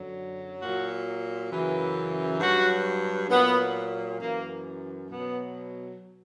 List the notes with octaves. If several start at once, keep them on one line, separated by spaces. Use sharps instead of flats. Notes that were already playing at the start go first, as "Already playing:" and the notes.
Already playing: F#2 D3 F#3
A#2 F#3 F#4
F#2 C#3 E3
G2 F#3 F#4
A#2 F#3 B3
F#2 E3 A#3
B2 F#3 B3